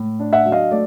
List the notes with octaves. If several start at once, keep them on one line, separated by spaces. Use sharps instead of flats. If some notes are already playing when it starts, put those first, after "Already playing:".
Already playing: A2
D4
E5 F#5
F#3
D#5 F5
A3 D5